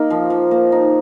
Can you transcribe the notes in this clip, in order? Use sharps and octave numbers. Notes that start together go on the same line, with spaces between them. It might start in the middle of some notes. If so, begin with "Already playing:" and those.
Already playing: A#3 D#4
F3
F3
A#3
D#4